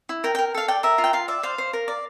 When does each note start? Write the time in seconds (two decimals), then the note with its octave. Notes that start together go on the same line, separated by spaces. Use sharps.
0.09 E4
0.24 A#4 G5
0.35 A#4 G5
0.54 A4 F5
0.68 D5 G5
0.83 A#4 E5
0.98 F4
1.04 G5
1.13 F4 F5
1.28 D5 E5
1.43 C5 F5
1.58 C5
1.73 A#4
1.88 D5